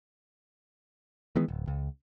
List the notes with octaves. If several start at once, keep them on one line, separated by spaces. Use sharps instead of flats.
D#3 E3 G#3 B3
D1
C#2